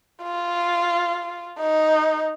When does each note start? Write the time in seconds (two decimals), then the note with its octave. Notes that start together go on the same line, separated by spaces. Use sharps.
0.23 F4
1.59 D#4